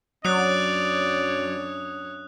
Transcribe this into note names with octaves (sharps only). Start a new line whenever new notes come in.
F#2 F#3 D4 C#5 D5 D#6 F#6